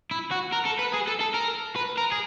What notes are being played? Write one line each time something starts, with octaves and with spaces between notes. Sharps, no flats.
E4
F#4
A#4
A4
B4
G#4
A4
A4
A#4
B4
A#4
G#4